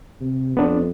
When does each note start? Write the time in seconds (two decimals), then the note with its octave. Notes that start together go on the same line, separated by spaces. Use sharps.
0.21 C3
0.57 F2 B3 D4